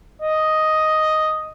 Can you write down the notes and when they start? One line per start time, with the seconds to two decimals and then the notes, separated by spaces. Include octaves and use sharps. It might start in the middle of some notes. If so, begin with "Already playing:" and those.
0.22 D#5